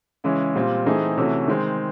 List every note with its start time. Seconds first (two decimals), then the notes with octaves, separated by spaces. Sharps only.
0.24 C#3 E3 G#3 C#4
0.55 A#2 G3 C4 F4
0.86 E3 A3 C4 D#4 G#4
1.18 C3 E3 A3 C#4 F#4
1.47 D#3 G#3 C4